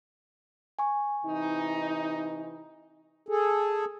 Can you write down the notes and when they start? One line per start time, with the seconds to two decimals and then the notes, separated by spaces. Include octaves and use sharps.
0.79 G#5 C#6
1.25 C3 E3 D#4
3.29 G#4 A4